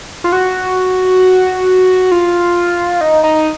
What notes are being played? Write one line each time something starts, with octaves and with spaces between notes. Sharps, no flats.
F4
F#4
F4
D#4
D#4